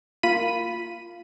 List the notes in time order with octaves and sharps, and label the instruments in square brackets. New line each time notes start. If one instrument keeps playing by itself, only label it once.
[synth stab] A#3 F4 B5 B6 D#7